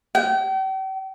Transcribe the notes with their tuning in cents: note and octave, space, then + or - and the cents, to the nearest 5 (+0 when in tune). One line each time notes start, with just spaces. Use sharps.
G5 -40